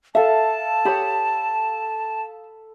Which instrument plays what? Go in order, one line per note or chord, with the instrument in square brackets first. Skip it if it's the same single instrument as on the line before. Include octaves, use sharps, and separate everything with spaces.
[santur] A4 F5 [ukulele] E5 [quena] A5
[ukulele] G4 C#5 [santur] B5 D#6